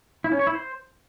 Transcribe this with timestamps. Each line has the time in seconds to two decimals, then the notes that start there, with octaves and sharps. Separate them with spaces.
0.24 E4
0.32 C#4
0.39 C#5
0.47 E4
0.54 C5